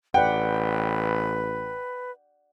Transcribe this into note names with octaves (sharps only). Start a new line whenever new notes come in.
A1 B4 D5 F#5 G5